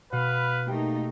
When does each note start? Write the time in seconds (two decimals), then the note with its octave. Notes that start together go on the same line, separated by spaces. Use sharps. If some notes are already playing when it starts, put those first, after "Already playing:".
0.12 B2 B4 F5 B5
0.68 A3 A#3 D#4 G4 G5